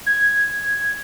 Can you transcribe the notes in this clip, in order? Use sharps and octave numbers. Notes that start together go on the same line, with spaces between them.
G#6